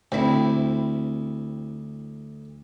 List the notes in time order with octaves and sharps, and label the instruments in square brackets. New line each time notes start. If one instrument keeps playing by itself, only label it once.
[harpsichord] D2 [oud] C4 E4